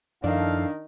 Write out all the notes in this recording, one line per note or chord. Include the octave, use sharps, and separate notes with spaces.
F#2 D#3 F3 D4 E4 A4 F5